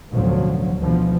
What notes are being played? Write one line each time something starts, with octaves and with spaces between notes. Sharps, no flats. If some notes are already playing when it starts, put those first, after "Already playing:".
A1 D2 B2 F3 F#3
D2 B2 E3 F3